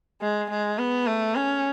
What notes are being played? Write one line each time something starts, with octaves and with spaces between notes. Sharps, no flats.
G#3
G#3
B3
A3
C#4